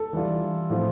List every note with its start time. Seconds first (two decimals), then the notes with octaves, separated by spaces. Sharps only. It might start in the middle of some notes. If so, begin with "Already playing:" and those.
Already playing: A4
0.13 E3 G3 D4 F4
0.70 A2 F3 C4 F4